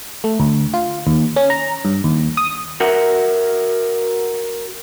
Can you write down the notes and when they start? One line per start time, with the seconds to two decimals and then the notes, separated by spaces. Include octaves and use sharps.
0.24 A3
0.40 D2
0.74 F4
1.07 D#2
1.36 C#4
1.50 A#5
1.85 G2
2.04 D#2
2.37 D#6
2.80 F#4 A#4 E5 F#5